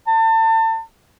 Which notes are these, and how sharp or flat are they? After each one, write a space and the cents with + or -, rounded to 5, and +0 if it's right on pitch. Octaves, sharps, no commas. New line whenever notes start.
A5 +30